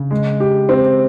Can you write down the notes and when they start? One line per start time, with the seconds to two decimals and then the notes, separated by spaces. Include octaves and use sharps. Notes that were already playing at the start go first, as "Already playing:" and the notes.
Already playing: C#3
0.11 G#3
0.40 G4
0.69 C4